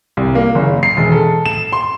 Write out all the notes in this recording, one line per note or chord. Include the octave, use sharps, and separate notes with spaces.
C2
A#3
F#1
C7
E1
A4
E7
C6